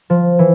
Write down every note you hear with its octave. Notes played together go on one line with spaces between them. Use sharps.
F3
E3